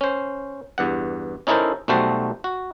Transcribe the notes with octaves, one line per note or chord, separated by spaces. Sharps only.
C#4 C5
E2 G2 F#5
C#4 D#4 E4 A4 A#4 C5
B1 G3 A3 F#4 C5 A5
F#4